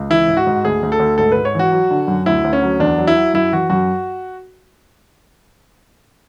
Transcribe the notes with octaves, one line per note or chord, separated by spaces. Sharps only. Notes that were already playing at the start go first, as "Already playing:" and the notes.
Already playing: C#2
E3 E4
G#2
F#4
G#2
D2 G#4
D2
A4
D2
G#2 A4
G#2 B4
C#5
E3 F#4
F#3
D3
F#2
D2 E4
D2
C#4
F#3
E2 D4
F#3
E4
F#3
F#2 E4
E3 F#4
F#2 F#4